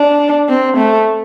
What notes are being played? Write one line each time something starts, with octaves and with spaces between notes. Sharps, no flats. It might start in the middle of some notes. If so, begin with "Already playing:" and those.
Already playing: D4
C4
A3